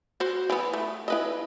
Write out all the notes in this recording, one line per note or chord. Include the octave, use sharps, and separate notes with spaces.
F#4 C5
E3 B3
A3
E4 B4 D#5